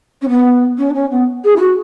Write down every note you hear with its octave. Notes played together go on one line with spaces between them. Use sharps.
C#4
B3
C#4
D4
C#4
B3
G#4
E4
F#4